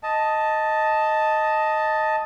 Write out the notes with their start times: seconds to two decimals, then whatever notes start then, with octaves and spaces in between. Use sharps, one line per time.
0.03 D#5 A5